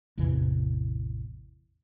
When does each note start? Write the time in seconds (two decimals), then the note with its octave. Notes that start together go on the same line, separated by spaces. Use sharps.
0.18 A1 E2 C3 E3